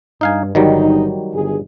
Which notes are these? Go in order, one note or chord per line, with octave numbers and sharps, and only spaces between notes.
G2 D#4 F5 G#5
G1 D#3 F#3 G3 D#4
G1 G#4